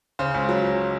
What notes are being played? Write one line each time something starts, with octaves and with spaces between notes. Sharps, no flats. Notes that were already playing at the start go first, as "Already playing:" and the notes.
C#3 C5
C#2
F#3